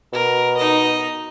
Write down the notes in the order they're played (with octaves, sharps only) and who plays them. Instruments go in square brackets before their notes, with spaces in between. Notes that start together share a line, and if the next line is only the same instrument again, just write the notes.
[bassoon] B2 [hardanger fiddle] A#4
[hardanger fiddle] D#4 D#5